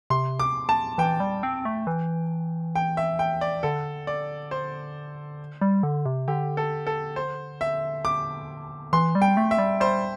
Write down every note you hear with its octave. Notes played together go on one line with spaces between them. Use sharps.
C3 C6
D6
A5
E3 G5
G3
C4
A3
E3
G5
E5
G5
D5
D3 A4
D5
C5
G3
D3
C3
D3 G4
A4
A4
C5
E5
D6
E3 C6
G3
G5
A3
E5
G3
G3 C5